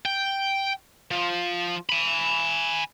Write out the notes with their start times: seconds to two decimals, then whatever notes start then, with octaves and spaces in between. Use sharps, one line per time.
0.05 G5
1.11 F3
1.89 G#5 B5